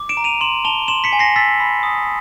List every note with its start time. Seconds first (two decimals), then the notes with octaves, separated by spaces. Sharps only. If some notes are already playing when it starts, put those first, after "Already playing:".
Already playing: D6
0.09 D7 E7
0.17 A#5
0.24 D#7 F7
0.41 C6 E7 F#7
0.65 A5 F7 G7
0.88 C6 E7 F#7
1.04 B6 C#7
1.13 G#5
1.19 A#6 C7
1.36 E6 A6 B6
1.60 B5
1.83 D#6